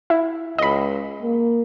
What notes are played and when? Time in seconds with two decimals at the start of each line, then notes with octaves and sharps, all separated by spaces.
0.10 E4
0.58 C#2 D#5 B5
1.22 A#3